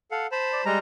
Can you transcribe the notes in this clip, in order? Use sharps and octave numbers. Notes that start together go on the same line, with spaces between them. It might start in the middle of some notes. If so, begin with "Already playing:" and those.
A4 F5 F#5
C5 A5 B5
D5
G3 G#3 A#5